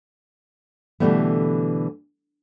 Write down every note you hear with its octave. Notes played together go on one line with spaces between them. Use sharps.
B2 D3 E3 G3 A3 B3